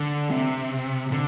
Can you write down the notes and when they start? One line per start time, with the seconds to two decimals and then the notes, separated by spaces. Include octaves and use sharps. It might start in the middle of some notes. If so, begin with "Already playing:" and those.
Already playing: D3
0.31 C3
1.12 D3